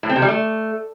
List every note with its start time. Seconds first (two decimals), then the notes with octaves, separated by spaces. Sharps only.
0.03 A2
0.09 C4
0.16 C3
0.22 G3
0.28 A3